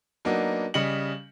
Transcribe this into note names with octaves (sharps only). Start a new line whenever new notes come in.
F#3 A#3 B3 D4 D#4
C#3 G3 D#5 C#7 F#7